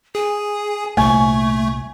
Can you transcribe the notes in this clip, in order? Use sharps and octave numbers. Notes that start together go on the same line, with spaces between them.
G#4 G#5
C2 A#2 A3 G#5 C#6